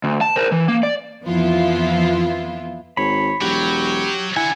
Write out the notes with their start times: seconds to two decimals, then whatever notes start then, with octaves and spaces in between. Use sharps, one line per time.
0.04 D2
0.21 A5
0.36 A#4 C5
0.52 E3
0.68 A#3
0.83 D5
1.23 F2 E3 F3 B3 E4 F4
2.97 G#1 C#5 B5
3.42 E1 F#3 F#4 G4
4.37 D4 E4 F#5 G#5